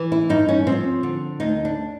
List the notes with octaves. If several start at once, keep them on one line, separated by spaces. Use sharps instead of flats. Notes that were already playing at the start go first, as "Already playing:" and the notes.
Already playing: E3
E4
G2 D#4
C#4
F3 C4
D3
D2 D#4
D4